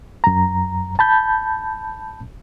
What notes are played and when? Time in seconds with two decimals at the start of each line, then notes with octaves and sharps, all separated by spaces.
0.24 F#2 A#5
0.99 A5 B5 G6